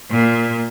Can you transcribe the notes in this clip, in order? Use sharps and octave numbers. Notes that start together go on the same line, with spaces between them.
A#2